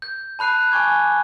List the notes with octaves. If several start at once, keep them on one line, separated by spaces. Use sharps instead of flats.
G6
A5 B5 F#6 C7 D#7
G#5 A5 C#6 D6 G6 G#6